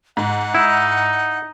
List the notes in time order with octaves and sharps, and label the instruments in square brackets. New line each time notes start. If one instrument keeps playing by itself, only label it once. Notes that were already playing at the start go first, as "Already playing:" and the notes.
[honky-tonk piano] G#2 [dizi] F#5
[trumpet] D#4 [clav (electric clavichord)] E4